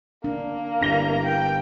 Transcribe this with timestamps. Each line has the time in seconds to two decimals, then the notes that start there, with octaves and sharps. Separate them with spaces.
0.24 A#3 D4
0.81 G1 D4 E4 A#5 A#6 G7
1.25 G5